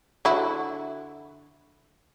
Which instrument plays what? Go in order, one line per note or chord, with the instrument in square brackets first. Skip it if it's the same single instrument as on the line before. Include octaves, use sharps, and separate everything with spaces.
[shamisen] D3 E4 F#4